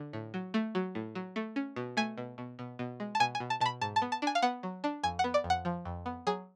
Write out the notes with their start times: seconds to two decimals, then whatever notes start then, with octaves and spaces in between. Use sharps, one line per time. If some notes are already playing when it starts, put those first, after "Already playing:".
Already playing: D3
0.13 A2
0.34 F#3
0.54 A3
0.75 F#3
0.95 A2
1.15 F#3
1.36 A3
1.56 C#4
1.76 B2
1.97 A3 G#5
2.18 B2
2.38 B2
2.59 B2
2.79 B2
3.00 G#3
3.15 A5
3.20 B2 G#5
3.35 G#5
3.40 B2
3.50 A5
3.60 B2 A5
3.66 B5
3.81 G#2 A5
3.96 A5
4.02 B3
4.12 A5
4.22 D4 G#5
4.35 F5
4.42 B3 F#5
4.63 F#3
4.84 D4
5.03 F2 G#5
5.19 F#5
5.24 B3
5.34 D5
5.44 F2
5.50 F#5
5.65 F3
5.85 F2
6.06 B3
6.27 F#3 G#4